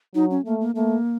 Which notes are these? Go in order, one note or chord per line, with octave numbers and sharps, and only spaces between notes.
F#3 D#4
C#4
A3 A#3
A#3
A3 A#3